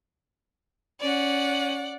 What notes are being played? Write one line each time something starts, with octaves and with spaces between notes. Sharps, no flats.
C#4 D5 F#5